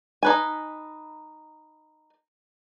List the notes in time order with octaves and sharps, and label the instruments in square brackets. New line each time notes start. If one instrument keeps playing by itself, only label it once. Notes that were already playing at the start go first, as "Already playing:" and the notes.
[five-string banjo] D#4 B4 G#5